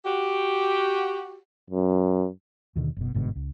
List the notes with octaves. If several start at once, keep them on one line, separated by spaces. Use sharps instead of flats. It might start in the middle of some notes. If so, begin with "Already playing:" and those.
F#4 G4
F#2
D#2 B2 D3 D#3
F#1 B2
G1 G#2 B2 D3
C#2